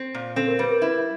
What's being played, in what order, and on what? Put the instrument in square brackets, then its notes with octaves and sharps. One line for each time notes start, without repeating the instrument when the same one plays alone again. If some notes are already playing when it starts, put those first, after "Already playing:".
Already playing: [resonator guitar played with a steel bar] C4
A#2
[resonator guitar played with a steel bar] C4 [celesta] A4
[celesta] A#4
[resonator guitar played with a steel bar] G3 [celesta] B4
[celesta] A#4
[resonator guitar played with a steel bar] E4 [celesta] B4